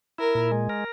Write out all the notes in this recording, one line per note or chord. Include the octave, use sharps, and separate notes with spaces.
E4 A#4
A#2
G#3
A#4